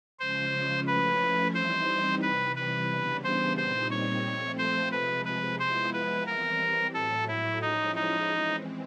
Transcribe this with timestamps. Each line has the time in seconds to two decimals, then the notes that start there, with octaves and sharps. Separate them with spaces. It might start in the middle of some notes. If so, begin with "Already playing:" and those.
0.19 C#3 F3 G#3 C#4 C5
0.87 F3 A3 C#4 E4 B4
1.54 E3 G3 C4 D#4 C5
2.22 C3 E3 G3 B4
2.56 B4
2.89 C#3 E3 G3 B3 D4
3.24 C5
3.56 A#2 G3 C4 D#4 C5
3.91 C#5
4.25 F3 A3 C4
4.58 C5
4.92 C3 F3 G#3 B4
5.25 B4
5.59 F3 G#3 B3 E4 C5
5.93 B4
6.26 E3 G3 C4 A#4
6.94 A2 F#3 A3 A4
7.28 E4
7.61 F3 G#3 C#4 D#4 E4
7.95 D#4
8.29 E3 G#3 C4